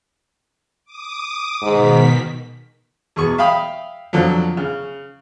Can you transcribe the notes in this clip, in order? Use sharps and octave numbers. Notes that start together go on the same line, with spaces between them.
D6 D#6
G#2 B2 D#3 B6
E2 B2 G#4 C#6
E5 F5 G5 B5 D#6
F2 D3 F3 F#3
C#3